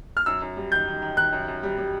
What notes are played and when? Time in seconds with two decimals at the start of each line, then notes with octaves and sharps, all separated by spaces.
0.17 F6
0.26 F#2 E6
0.42 F#2
0.57 G3
0.72 D#3 G6
0.87 D#3
1.02 D#3
1.17 D#3 F#6
1.33 F#2
1.48 F#2
1.63 G3
1.78 G3